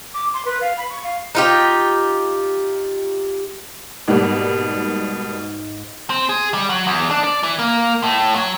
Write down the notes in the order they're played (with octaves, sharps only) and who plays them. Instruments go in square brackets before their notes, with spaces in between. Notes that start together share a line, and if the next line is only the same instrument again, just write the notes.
[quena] D6
C6
B4
F5
B5
C#6
F5
[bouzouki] D#4 F4 G4
[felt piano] G#2 [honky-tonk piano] B2 G3 A#3
[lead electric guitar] C4
G#4
G3
F#3
E2
D4
D5
E3
A#3
A2
F#3